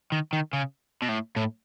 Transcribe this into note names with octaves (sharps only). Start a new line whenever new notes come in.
D#3
D#3
C#3
B2
A2
A2